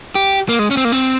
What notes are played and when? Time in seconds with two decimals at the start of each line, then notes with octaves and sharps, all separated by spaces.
0.15 G4
0.49 A#3
0.59 G#3
0.71 C#4
0.77 C4
0.85 A#3
0.92 C4